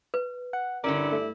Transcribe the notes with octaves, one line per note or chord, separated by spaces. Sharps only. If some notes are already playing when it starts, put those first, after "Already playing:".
B4
F#5
G2 D3 C#4 E4 A#4 D5
A3